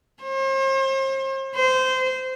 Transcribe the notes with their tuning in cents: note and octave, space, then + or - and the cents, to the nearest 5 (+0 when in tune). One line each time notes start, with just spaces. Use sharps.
C5 +40
C5 -20